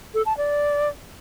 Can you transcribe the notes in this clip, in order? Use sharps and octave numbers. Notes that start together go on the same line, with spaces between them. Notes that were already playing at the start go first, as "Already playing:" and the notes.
A4
A5
D5